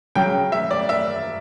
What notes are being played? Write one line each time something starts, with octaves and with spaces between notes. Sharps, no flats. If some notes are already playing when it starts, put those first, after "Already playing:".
C#3 F#3 G5
E5
D5
E5